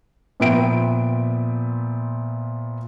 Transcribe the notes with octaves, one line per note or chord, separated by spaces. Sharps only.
A#2 F3 B3 E5 G5 D7